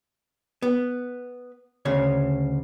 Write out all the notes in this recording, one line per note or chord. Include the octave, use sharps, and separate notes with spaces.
B3
D2 C#3 C#5